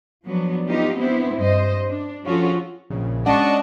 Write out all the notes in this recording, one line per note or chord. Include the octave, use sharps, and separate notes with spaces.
F3 F#3 B3 D4
B3 D#4 F4 G4
B3 C4 D4 E4 C5
G2 C5 D#5
D4
F3 C#4 F4 F#4 G#4 A4
A#1 C#3
G#3 C#4 D4 D5 D#5 F#5 A5 C#6